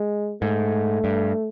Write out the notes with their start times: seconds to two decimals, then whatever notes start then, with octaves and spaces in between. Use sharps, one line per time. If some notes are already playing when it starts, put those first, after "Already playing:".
Already playing: G#3
0.42 G#2 A3
1.04 G2